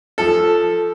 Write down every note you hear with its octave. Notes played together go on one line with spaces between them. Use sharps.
F3 A4